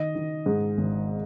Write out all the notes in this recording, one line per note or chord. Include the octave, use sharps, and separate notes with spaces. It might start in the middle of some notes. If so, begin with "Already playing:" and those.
Already playing: D#3 D#5
D#3
G#2
G#1